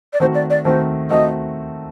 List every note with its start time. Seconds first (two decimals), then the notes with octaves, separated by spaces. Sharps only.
0.13 D5
0.20 D#3 A3 C4 F#4 C5
0.35 D5
0.50 D5
0.65 D#3 A3 C4 F#4 C5
1.10 D#3 A3 C4 F#4 D#5